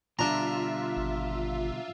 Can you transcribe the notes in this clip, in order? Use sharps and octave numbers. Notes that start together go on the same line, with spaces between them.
B2 D3 G3 D4 F4 E5 A#5
G#1